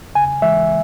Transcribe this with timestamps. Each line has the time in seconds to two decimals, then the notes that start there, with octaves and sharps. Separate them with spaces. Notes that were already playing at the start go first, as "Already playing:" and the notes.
0.15 C#3 G#5
0.42 E3 G#3 E5